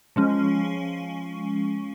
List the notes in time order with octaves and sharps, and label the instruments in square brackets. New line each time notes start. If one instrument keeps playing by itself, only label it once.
[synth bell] F3 G#3 C#4